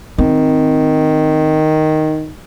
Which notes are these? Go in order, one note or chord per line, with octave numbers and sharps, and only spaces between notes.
D#3 C4